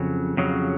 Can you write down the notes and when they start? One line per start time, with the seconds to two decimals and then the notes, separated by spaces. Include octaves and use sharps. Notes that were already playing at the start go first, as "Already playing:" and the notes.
Already playing: F2 C#3 F#3
0.37 F2 C#3 F#3